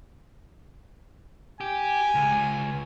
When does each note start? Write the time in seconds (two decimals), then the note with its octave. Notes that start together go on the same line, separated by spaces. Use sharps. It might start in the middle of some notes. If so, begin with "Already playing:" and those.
1.61 G4 G#5
2.15 C#2